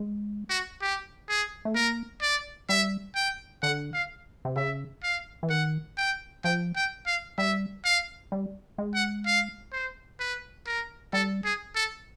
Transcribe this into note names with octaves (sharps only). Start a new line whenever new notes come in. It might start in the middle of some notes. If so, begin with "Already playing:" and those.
Already playing: G#3
F#4
G4
G#4
A3
A#3 A#4
D5
G3 E5
G5
D3 F#5
F5
C3
C#3 E5
F5
E3
D#3 F#5
G5
F3 G5
G5
F5
G3 E5
F5
G3
G#3
F#5
F5
C5
B4
A#4
G3 A4
G#4
A4